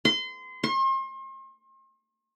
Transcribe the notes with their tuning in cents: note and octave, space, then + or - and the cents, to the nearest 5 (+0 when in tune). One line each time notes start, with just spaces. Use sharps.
C6 -30
C6 +40